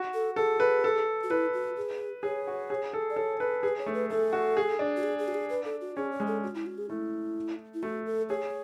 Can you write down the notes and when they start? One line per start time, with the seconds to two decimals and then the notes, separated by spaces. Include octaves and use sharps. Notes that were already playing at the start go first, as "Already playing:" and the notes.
Already playing: F#4
0.14 A4
0.36 G#4 A4
0.60 B4
0.84 A4
1.23 F#4
1.30 E4 B4
1.54 F#4
1.77 G#4
2.23 G#4 C#5
2.47 F#4
2.70 G#4
2.93 A4
3.10 D5
3.16 A4 C#5
3.40 A4 B4
3.63 G#4 B4
3.79 C#5
3.86 A3
3.94 B4
4.10 A3 A4
4.33 F#4
4.57 G#4
4.79 D4
4.97 F#4
5.03 G#4
5.19 G#4
5.28 F#4
5.34 G#4
5.50 B4
5.65 A4
5.81 F#4
5.96 C#4 G#4
6.11 C#5
6.20 G#3
6.27 A4
6.43 F#4
6.55 E4
6.66 F#4
6.78 G#4
6.90 A3 E4
7.74 E4
7.83 A3 F#4
8.06 A4
8.29 G#4 C#5